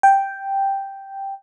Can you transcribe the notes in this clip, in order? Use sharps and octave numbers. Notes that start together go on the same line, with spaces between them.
G5